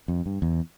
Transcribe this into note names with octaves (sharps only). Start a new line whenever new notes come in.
F2
G2
E2